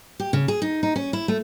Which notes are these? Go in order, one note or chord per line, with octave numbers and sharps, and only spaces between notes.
G4
C#3
G#4
D#4
D#4
C#4
E4
A3